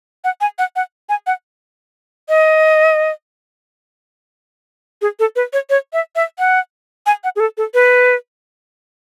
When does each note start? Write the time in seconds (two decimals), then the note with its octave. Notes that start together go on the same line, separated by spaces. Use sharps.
0.24 F#5
0.41 G#5
0.58 F#5
0.76 F#5
1.09 G#5
1.27 F#5
2.29 D#5
5.02 G#4
5.19 A4
5.36 B4
5.53 C#5
5.70 C#5
5.93 E5
6.16 E5
6.39 F#5
7.06 G#5
7.24 F#5
7.36 G#4
7.40 A4
7.57 A4
7.74 B4